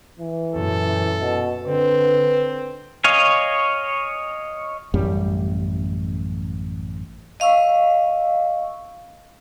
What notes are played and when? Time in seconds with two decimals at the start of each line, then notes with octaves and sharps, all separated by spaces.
0.19 E3
0.53 F#2 A#2 A4
1.21 B2
1.64 D3 C4 B4
3.04 C#5 D#5 F5 G#5
4.94 A1 F#2 G3
7.40 D#5 F5 C#6 E6